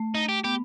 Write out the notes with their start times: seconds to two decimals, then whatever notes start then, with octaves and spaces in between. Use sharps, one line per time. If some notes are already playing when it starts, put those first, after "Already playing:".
Already playing: A3
0.15 D#4
0.29 G4
0.44 B3 G4